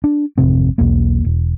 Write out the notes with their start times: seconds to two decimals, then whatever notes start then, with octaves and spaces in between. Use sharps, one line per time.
0.04 D4
0.38 G#1 F2 C3 C4
0.78 B1 E2 A#3
1.25 E1